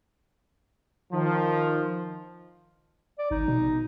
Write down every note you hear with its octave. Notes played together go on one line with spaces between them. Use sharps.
D#3 F3
D5
G#1 D#4
B2